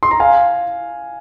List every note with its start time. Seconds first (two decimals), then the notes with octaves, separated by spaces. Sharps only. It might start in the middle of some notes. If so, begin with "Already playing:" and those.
0.03 C6
0.11 A#5
0.20 F5 G#5